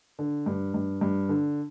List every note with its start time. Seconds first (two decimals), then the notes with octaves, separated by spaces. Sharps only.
0.19 D3
0.46 G2
0.74 G2
1.01 G2
1.29 D3